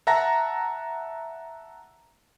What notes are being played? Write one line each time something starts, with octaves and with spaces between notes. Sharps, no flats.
E5 F#5 A5 A#5 A#6